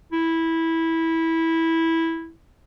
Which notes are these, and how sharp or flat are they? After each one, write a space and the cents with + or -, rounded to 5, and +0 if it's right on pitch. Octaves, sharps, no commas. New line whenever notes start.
E4 -10